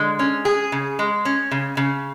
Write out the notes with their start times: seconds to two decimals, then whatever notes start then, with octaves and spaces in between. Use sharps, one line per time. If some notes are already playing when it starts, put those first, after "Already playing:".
Already playing: D3 G#3
0.19 C#4
0.45 G#4
0.72 C#3
0.99 G#3
1.25 C#4
1.51 C#3
1.77 C#3